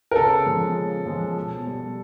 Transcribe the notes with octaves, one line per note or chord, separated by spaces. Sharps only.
A#4
C#3 A4
F3 G#3
C#3
F3 G#3
B2
G3